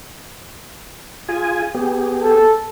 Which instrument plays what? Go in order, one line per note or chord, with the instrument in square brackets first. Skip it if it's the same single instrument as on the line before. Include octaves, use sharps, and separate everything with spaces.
[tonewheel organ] F4 G#4 G#5
B3 G4 G#4
[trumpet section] A4